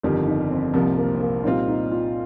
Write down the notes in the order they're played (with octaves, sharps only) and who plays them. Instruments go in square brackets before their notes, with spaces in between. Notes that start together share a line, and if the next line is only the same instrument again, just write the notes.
[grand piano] G1 F2 D#3 G3 [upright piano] F4
[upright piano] D#4
C4
[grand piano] C2 C3 F3 [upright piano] A#3
[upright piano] A#3
C4
A#3
[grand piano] A#2 G3 C4 F4 [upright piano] D#4
[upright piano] D#4
F4